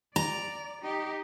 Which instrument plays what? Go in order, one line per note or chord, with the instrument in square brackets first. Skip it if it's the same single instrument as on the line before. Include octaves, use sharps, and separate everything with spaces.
[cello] D5 [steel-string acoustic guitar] A#5
[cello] D#4 G4